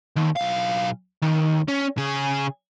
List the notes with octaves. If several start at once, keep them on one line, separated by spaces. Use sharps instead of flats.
D#2
B1 F5
D#2
C#4
C#3 G#4